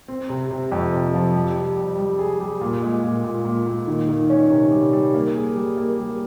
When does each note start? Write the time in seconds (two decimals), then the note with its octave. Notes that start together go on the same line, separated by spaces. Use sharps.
0.08 C4
0.30 C3
0.51 C3
0.72 F2
0.93 C3
1.14 F3
1.35 G3
1.56 G3
1.77 G3
1.98 G3
2.19 G#4
2.40 G3
2.61 A#2
2.82 G#3
3.03 A#2
3.24 A#2
3.45 A#2
3.67 A#2
3.87 D#3
4.09 D#3
4.30 C#4
4.50 C3
4.72 G3
4.93 G3
5.14 A#3
5.35 G#4
5.56 G3
5.77 A#3
5.98 G3